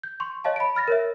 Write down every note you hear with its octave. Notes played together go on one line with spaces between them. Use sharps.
G6
C6 C#6
C#5 D#5 F5 A5
B5 D7
B5 F6 A6 A#6
A#4 C#5 E5